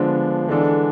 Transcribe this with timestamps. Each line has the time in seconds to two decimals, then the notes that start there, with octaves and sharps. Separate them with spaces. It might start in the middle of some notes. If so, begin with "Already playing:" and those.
Already playing: D3 F3 G#3 B3 D4
0.48 D3 E3 G#3 D4 A4